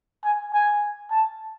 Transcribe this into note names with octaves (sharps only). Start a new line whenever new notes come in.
G#5
G#5
A5